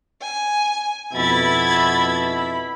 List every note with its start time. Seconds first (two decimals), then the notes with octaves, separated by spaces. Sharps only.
0.22 G#5
1.13 F2 B2 E4 E5 B5 G#6 A6